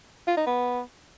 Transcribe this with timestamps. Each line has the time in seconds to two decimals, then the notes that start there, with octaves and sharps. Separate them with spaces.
0.27 F4
0.37 D#4
0.46 B3